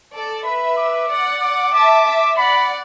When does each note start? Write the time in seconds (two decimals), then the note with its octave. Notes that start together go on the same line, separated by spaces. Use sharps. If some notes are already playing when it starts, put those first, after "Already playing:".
0.13 A4 D5
0.45 B4 E5 B5
0.77 D6
1.09 D5 F#5
1.42 D6
1.73 E5 A5 D6
2.06 E5 A5
2.37 D5 F#5 B5